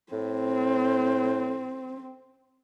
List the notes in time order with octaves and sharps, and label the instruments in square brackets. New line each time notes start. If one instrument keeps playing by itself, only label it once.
[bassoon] A2 [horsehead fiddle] C4